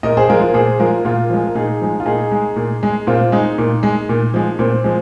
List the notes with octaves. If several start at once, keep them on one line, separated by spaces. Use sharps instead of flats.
A#2 A#4 D#5
G#4 C5
G#3 F4 A#4
F3
F4 A#4
A#2 G#4 C5
F3 G#3 F4 A#4
A#2 F4 A#4
F3 G#3
A#4
A#2 D#4 G#4
F3 G#3
F4
A#2 D#4 G#4
G#3
A#2
G#3
A#2 C4 F4
G#3 D#4
A#2
G#3
A#2
F3 G#3
A#2 C4
F3 G#3